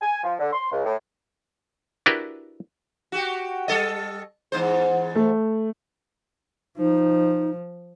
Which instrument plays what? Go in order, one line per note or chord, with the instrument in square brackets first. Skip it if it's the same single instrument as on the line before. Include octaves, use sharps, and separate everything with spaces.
[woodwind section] G#5
F3
D3
C6
C#2
A2
[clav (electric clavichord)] D4 E4 F#4 G4 A#4 B4
[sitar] F#4 G4
G3 A4 D#5
E2 G#2 C5
[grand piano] A3
[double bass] F3 [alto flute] D#4